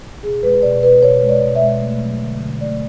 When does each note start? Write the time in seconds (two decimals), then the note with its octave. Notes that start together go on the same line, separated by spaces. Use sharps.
0.23 B2 G#4
0.43 G#3 B4
0.62 B2 D5
0.83 G#3 B4
1.02 B2 C#5
1.22 G#3
1.29 D5
1.41 B2
1.55 E5
1.62 G#3
1.81 A3
2.01 F#3
2.21 D3
2.41 D3
2.61 A3 D5